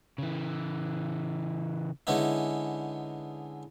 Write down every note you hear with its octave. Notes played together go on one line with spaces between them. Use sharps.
C#3 E3
D3 G#3 B3 C#4 D#4 E4